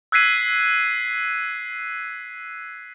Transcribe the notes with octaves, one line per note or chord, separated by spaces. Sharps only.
E6 F#6 G#6 B6 C7 D#7